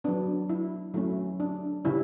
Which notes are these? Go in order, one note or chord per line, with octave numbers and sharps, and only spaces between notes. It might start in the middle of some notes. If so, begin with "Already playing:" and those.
F#3 B3 D4
E4
F#3 A3 C#4 E4
D4
C#3 G3 C#4 E4